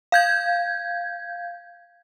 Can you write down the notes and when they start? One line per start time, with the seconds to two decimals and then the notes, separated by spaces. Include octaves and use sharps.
0.12 F5 G6 G#6